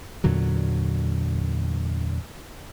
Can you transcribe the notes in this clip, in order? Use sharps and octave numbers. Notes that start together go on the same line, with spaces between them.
E2 A#2 D3 F#3